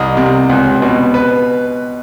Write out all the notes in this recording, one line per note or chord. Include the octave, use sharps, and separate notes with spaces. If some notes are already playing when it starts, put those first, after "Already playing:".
Already playing: C2 D#5
C3
C#2
B2
B4